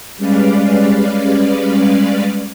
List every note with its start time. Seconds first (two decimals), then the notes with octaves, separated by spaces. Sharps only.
0.17 G3 G#3 C#4 B4 D5 F5